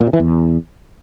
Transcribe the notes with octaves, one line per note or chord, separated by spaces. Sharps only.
A#2
C3
E3
E2